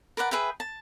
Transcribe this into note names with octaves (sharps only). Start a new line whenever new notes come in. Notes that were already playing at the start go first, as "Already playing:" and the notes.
A#4 B4 D5 F#5
G#4 B4 E5 G5
A5